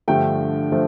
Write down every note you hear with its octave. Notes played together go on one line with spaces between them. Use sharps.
G2 D3 F3 A3 G5
F3 A3